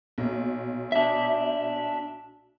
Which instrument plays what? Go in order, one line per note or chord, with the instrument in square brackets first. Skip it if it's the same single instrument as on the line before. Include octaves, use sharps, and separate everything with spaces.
[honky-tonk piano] B1 A#2
[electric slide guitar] D4 E5